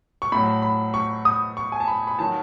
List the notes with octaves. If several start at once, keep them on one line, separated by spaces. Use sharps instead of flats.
C#6
A2 F#3 B5
B5
C#6
D#6
C#6
G#5
A5
B5
B5
D#3 F#3 A5